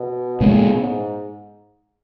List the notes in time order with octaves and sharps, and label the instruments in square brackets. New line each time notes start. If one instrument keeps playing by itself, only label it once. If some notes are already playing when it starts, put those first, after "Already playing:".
Already playing: [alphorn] B2
[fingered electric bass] A#2 G#3 B3 [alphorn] C#3
[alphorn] G#2